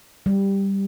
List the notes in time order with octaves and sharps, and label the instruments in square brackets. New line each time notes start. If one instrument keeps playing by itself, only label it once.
[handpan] G3